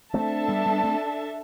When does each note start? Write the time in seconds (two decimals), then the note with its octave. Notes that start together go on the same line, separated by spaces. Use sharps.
0.14 A3 C4 D4 A4 E5 A5
0.48 G3 B3
0.66 G3 B3
0.84 A3 C4